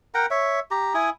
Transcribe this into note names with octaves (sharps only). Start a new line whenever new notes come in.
A#4 F#5 G5 A#5
C#5 E5
G4 A#5
E4 G#5 D#6